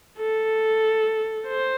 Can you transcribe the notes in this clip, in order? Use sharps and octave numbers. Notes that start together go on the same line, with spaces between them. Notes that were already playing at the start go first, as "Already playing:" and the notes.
A4
C5